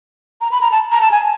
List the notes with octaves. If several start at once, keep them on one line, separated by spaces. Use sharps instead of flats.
A#5
B5
A#5
A5
A#5
A5
G#5